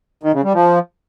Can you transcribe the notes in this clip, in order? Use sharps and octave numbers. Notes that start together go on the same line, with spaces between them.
D#3
C#3
G3
F3